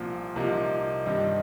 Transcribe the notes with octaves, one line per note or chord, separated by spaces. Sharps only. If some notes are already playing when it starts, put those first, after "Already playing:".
Already playing: C2 A#2 F3
C2 C3 F3 A#3 D#4
G2 D#3 G3 C4 D#4